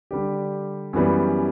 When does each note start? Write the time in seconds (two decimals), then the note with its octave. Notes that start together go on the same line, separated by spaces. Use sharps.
0.11 D3 G3 D4 G4
0.93 F#2 E3 G3 B3